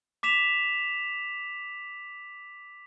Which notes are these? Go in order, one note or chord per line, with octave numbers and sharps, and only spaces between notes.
D6 B6 E7 F7